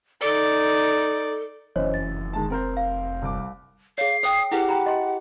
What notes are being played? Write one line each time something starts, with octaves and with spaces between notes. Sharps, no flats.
D#4 A4 D5
F1 F#2 E3 C5 C#5 D#5
A6
D#3 G#3 A5
C4 A#4 C5
F5
C2 D6
G#4 C#5 F5 C7
C5 G5 D#6
E4 G4 G#4 B4 F#5
G5 A#5 B5
D#5 C6